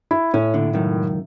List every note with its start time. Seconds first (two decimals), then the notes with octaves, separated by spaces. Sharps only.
0.11 E4
0.34 A2 C#4
0.54 A#2 D3
0.73 C#2 F#2 D#3